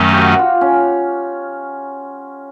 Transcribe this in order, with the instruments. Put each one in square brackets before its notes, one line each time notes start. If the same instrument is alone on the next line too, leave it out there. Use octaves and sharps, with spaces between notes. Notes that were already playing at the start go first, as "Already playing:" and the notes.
Already playing: [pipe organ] F#2 D#3 F#3 A3 C#4
[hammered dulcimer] F#4 G4
F#4
F4
C#4